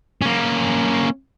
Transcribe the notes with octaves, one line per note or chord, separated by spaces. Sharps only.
A#3 C#4